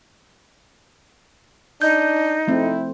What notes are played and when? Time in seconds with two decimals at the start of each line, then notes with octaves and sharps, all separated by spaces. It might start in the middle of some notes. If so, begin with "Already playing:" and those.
1.82 D4 D#4 G6
2.47 F3 A3 C4 E4